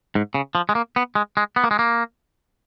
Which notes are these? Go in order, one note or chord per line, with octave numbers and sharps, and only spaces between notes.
G#2
C#3
F3
G#3
A#3
B3
G#3
G#3
B3
A#3
G#3
A#3